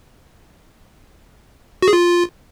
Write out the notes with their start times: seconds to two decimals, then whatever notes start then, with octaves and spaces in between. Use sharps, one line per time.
1.82 F#4
1.88 G#4
1.93 F4